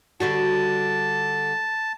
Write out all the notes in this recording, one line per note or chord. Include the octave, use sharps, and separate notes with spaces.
D3 G3 F#4 A5